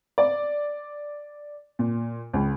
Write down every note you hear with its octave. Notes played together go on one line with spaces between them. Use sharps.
D5
A#2
C#2